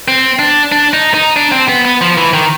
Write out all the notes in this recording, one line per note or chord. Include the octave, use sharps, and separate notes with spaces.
C4
D4
D4
D#4
D#4
D4
C4
B3
B3
F3
E3
D#3